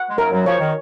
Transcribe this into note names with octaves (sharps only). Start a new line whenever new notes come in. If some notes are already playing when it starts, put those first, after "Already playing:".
Already playing: F#5
G#3
F#2 F#3 A#4
F#2 F#3
F3 C#5
D#3